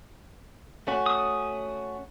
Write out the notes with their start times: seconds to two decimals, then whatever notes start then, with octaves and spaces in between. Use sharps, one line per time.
0.87 A3 C#4 F#4
1.06 D#6